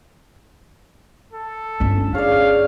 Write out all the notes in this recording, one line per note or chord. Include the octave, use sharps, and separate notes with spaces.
A4
G1 C#4 E5
G#4 C#5 D5 F5